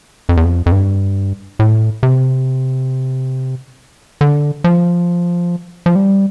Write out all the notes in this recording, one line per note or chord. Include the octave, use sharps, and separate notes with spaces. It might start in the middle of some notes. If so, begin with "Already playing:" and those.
F2
E2
F2
F2
G2
A2
C3
D3
F3
F3
G3